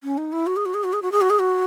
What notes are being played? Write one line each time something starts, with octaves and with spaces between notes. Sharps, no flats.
C#4
D#4
E4
F#4
G#4
F#4
G#4
F#4
G#4
F#4
G#4
F#4
G#4
F#4